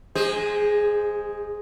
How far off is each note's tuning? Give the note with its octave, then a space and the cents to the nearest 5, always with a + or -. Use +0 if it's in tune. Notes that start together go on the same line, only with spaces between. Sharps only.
G#3 +0 G#4 -40 C5 +0